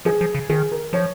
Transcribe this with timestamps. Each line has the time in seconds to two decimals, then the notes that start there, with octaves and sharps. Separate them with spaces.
0.05 F3 G#4
0.21 F3
0.35 C#3
0.49 D#3 G#4
0.72 A#4
0.93 F3 C#5